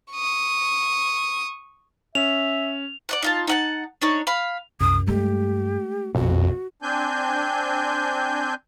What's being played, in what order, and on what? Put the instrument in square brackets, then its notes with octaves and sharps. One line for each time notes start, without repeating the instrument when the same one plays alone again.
[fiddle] C#6 D#6
[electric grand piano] C#4 [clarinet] E5 [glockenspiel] F7
[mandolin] D5 D#5 F#5
D#4 F4 A5
D#4 F#5 A5
D4 D#4 C#5
F5 B5
[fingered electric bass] C2 [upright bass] F#2 [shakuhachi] D#6
[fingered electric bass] G2 [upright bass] G#3 A3 [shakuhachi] G4
[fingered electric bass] A#1 B2 [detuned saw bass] F2 [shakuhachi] F#4
[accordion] C4 D4 G#5 G6